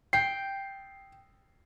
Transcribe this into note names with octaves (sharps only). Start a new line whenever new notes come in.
G5 C7